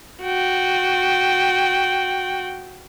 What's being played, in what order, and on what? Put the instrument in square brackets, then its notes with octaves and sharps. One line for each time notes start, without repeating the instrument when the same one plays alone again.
[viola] F#4 G5